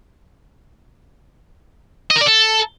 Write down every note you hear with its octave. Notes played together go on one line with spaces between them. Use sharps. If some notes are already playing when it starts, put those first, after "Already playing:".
D#5
A#4
D5
A4